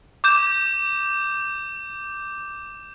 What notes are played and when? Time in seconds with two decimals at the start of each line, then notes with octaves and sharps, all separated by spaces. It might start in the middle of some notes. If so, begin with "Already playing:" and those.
0.24 D6 G6 E7